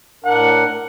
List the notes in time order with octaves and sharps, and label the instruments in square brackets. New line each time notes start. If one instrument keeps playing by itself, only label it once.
[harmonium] A2 D4 A#4 [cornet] F#5